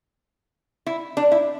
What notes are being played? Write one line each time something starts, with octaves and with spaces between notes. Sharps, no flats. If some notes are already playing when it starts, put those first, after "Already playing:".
E4
D4
E4